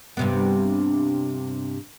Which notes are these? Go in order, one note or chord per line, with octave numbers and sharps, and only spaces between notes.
G2 C3 B3